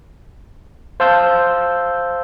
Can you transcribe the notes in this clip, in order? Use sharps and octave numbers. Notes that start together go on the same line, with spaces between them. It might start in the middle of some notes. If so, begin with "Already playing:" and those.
C5 F5 A5 E6 G6